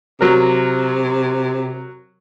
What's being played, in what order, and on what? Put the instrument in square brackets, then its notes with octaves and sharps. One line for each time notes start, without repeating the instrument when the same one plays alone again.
[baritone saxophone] C3 [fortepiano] F#3 A#4